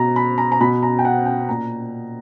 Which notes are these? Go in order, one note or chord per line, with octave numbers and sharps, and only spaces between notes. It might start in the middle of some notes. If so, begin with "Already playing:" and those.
Already playing: B2 A#5
B5
A#5
A#5
B2 B5
A#5
G5
F#5
G5
A#2 A#5